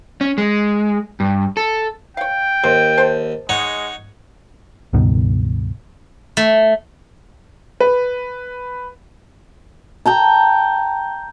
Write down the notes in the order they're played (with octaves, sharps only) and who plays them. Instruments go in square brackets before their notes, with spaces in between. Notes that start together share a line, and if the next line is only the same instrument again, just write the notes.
[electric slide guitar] C#4
G#3
G2
A4
[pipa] C#5 F5 [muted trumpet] G5
[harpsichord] D#2 [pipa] C5
[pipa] C5 A5
[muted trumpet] G#3 [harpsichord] D#4 C#5 F#5
[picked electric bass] C#2 G2 B2 D#3
[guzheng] A3
[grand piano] B4
[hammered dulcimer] G5 A5 A#5